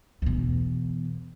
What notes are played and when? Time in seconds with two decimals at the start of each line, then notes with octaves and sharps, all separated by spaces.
0.22 E2 B2